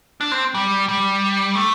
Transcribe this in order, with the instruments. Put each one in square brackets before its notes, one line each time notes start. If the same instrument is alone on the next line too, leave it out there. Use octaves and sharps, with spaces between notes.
[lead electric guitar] D4
C4
G3
G3
A3